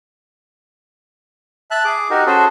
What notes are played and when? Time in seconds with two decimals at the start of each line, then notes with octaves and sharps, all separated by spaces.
1.71 E5 A5 F#6
1.85 G#4 D6
2.10 D#4 F#4 G4 A#4
2.26 C#4 F#4 G#4 A4 C5